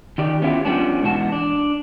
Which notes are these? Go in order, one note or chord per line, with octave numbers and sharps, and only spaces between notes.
D#3 G4 D5
B3 C#4 E4 F4 G4
F3 G3 B3 C#4 D4
G#2 B2 E3 B3 F#4 A5
D4